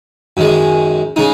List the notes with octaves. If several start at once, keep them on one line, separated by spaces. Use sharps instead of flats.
F#2 D#3 G#3
C#3 G#3 D#4